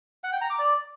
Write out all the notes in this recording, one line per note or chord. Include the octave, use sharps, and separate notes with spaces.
F#5
G5
A#5
D6
D5